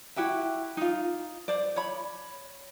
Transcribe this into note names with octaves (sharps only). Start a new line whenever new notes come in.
E4 F#4 G4 E5
D#4 F4
C5 D5
C#5 B5